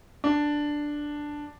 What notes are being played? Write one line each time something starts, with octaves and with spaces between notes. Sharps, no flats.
D4